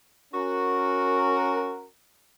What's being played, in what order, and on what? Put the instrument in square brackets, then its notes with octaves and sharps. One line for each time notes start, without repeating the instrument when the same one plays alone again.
[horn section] C#4 F#4 A#4